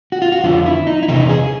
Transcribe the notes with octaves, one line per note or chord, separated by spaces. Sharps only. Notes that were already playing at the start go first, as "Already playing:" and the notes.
F#4
F4
F#4
F2 D3 F4
E4
D#4
E4
E2 C3 D#4
G#4